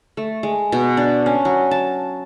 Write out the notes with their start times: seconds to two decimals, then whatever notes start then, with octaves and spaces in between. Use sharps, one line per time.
0.17 A3
0.43 G#3
0.72 B2
0.97 D4
1.26 C#4
1.45 F#3
1.71 A5